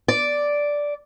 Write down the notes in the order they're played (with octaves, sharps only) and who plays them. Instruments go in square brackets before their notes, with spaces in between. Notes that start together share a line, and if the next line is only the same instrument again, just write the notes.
[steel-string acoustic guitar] D5